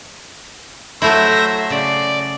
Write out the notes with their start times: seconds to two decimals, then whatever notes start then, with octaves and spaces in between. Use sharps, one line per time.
1.02 F#3 A3 E4 C5 E5 A#6
1.70 C#3 D5